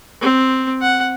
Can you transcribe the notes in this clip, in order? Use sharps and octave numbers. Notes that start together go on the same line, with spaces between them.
C4
F#5